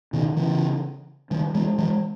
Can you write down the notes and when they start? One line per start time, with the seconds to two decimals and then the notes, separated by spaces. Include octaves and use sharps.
0.13 B2 D#3
0.37 C#3 E3
1.31 D#3 G3
1.54 E3 G#3
1.78 E3 G#3